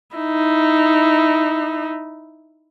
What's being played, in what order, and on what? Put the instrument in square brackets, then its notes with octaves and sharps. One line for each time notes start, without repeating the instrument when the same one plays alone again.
[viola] D#4 E4